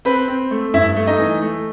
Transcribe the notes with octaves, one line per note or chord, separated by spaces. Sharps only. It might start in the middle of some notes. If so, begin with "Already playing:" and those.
C4 B4 B5
C4
A3
G2 E4 E5
A3
D#4 D#5
E3
A3